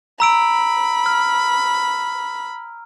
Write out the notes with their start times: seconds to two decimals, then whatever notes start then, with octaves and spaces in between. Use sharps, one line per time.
0.20 A#5 B5 E6 D7
1.06 F6